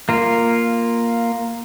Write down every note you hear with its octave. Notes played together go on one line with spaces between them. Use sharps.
A#3 F4